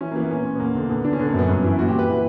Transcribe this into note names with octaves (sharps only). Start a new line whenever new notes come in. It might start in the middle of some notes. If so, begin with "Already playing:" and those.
E3 C#4
A#3
E3 B3
A#2 C#4
A#2
B3
E2 A#3
D3
D3 B3
D3 D4
C#4
D3 B3
A#3
F#2 B3
G2 C#4
E3 E4
A#2 F#4
G4
A#2
B4
E3